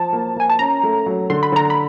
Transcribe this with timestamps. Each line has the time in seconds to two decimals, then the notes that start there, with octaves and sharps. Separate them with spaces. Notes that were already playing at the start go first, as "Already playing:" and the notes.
Already playing: F3 A5
0.13 A#3
0.36 A#3 G#5
0.50 A5
0.59 C#4 A#5
0.83 A3
1.06 F#3
1.30 D3 C6
1.43 B5
1.52 D3 A#5
1.70 B5